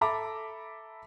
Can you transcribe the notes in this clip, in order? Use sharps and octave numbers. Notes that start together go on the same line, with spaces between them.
A4 E5 A#5 B5 D6